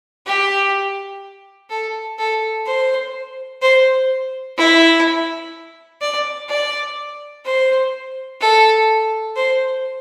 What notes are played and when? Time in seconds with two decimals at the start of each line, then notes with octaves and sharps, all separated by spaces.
0.27 G4
1.70 A4
2.18 A4
2.66 C5
3.62 C5
4.58 E4
6.01 D5
6.49 D5
7.45 C5
8.41 A4
9.36 C5